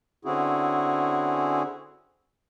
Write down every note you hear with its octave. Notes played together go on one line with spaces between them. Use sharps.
D3 C4 C#4 E4 F#4 G#4